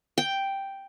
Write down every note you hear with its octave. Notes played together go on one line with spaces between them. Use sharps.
G5